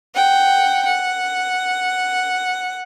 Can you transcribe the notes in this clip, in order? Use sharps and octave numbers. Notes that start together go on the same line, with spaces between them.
F#5 G5
F#5